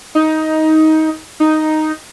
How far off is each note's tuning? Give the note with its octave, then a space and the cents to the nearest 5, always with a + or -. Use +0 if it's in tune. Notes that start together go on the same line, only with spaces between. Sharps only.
D#4 +15
D#4 +0